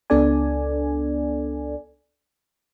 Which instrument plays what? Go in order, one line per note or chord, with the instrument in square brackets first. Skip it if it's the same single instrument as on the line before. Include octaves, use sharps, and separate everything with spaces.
[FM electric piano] C#2 B3 D4 A4 D5 G#5